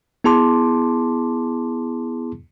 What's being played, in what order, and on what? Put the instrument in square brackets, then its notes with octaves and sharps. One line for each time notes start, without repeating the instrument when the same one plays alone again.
[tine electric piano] B3 E4 G#4 A5 C6 D6